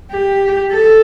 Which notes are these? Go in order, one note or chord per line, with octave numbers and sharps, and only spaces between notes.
G4
A4